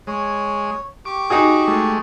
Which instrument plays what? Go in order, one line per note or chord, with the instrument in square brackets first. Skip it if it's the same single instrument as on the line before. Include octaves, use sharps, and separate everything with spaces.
[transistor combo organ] G#3 [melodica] C#5
[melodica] G4 C#6 [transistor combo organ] D6
[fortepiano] D#4 F#4 G#4
[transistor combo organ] G#3 A3